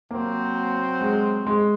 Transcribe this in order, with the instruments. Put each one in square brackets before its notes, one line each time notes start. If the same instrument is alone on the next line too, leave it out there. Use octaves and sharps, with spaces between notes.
[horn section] C3 F#3 C4 F#4 C5 [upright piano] A#3
[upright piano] G#3
G#3